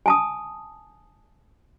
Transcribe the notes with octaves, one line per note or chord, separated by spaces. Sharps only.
G#5 A5 D#6